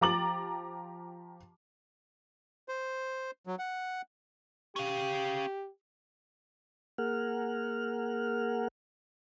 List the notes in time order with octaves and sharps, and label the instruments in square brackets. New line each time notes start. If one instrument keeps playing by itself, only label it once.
[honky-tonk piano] F3 G4 A#5 D6 A6 F#7
[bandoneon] C5
F#3
F#5
[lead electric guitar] C#4 F5 [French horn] G4
[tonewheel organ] A#3 G#4 A#4 F#5 F6